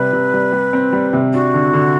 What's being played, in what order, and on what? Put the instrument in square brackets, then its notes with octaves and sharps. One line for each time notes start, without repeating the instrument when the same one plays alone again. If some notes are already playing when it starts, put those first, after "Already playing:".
Already playing: [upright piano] C3 G3 [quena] B4
[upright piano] C3
G3
G3
C4
G3
C3
[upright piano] D4 [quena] F#4
[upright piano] D3
D3